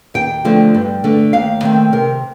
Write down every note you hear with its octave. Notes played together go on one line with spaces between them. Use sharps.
D#2 G5
D3 F3 A3 C4
G2
D3 A3
D#2 F5
D#3 A3 C4
C3 A#4